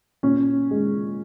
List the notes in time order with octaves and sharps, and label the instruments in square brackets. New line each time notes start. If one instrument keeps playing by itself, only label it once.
[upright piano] A#2 C#4
G#3